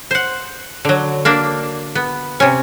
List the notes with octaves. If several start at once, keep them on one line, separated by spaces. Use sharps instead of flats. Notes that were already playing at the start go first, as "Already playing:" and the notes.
C5 F#5
D3 F#3
A#3 D4
B3
C3 C#4